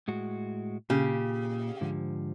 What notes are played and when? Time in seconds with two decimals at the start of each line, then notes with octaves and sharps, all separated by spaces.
0.08 A2 G#3 F#4
0.90 A#2 C#3 G4
1.81 G#2 D3 F3